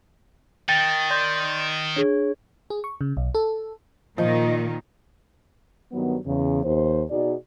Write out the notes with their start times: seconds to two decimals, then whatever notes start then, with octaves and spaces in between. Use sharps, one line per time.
0.69 D#3 G5 A6
1.11 D5 C6 G6
1.96 D4 G#4 C#5
2.70 G#4
2.84 C#6
3.01 C#3
3.17 B1
3.35 A4
4.18 A#2 D#3 F3 D#5
5.92 G2 D#3 F#3 B3
6.26 E2 C#3
6.64 D#2 C5
7.09 B2 D#4 F#4 G#4 D5